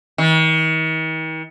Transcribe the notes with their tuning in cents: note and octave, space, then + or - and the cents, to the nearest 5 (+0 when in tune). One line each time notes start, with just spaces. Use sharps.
D#3 +45